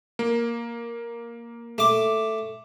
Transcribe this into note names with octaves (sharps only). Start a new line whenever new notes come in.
A#3
A3 D6